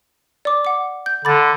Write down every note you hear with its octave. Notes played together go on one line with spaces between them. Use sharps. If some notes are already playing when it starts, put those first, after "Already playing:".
D5 D6
F#5 D6
G6
D3 B5 D6 A6